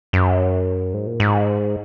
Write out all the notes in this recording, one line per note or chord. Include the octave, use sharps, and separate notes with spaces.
F#2
G#2
A#2
G#2